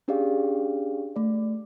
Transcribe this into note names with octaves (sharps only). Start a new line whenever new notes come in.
C#4 D4 G4 G#4 D5 F5
A3 D5